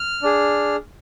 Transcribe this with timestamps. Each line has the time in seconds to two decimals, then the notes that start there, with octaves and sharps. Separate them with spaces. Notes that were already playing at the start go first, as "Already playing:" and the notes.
Already playing: F6
0.23 D4 G#4